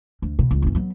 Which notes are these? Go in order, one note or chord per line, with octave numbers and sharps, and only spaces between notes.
D2
B2
C#2
G1 C#4
F#3 B3